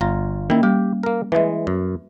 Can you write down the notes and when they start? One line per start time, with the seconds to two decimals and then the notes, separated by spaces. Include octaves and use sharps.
0.01 G1 F4 A#5
0.50 D#3 A#3 C#4 E4
0.63 G3 G4
1.03 A#3 A#4
1.32 E3 G#3 B4 E5
1.67 F#2